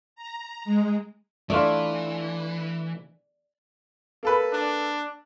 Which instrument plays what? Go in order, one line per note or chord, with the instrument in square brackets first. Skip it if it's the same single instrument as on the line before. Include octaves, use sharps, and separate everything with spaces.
[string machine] A#5
G#3
[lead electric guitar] E3 [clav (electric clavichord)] A3 D4 F4 [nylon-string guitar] D5
[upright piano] A#3 A4 B4
[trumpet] D4